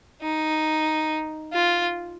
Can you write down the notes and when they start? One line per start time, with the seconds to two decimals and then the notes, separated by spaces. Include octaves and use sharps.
0.22 D#4
1.53 F4